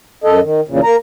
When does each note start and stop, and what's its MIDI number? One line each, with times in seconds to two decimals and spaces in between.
0.24 0.40 42
0.24 0.40 69
0.24 0.40 75
0.42 0.61 51
0.68 0.80 40
0.68 0.80 46
0.68 0.80 49
0.84 0.96 58
0.84 0.96 82